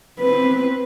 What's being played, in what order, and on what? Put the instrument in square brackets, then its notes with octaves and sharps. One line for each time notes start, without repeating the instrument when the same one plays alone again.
[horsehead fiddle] C4 B4